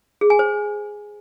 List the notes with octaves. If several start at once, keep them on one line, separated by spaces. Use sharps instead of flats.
G#4
G#5
C5